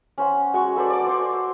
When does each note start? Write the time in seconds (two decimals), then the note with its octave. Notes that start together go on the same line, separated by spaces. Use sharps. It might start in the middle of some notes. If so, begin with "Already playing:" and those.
0.18 C#4 C5 F#5
0.54 G#3 F#4 G#5 C#6
0.76 A4 B4 C5 D5
0.90 D5 D6
1.06 C5 G#5 C6 C#6
1.33 E6